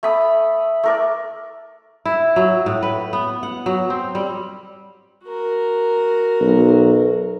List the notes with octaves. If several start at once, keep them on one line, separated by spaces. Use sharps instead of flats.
A3 B5 D#6
A3 A#4 D5
E4
F#3
A2
B4
B3
F#5
F#3
C4
G3
F#4 A#4
B1